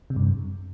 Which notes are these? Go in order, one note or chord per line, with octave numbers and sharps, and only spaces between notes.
C3
G2
F#2